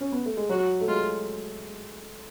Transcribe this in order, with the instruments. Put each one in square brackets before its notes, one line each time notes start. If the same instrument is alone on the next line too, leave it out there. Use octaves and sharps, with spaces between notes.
[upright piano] C#4
B3
A3
G#3
[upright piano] F#3 [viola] F#4
[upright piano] A3
[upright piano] G#3 [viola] F4